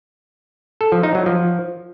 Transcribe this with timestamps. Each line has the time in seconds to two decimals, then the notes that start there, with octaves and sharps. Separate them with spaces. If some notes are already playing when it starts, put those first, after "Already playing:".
0.81 A4
0.92 F3
1.03 D#4
1.15 F#3
1.26 F3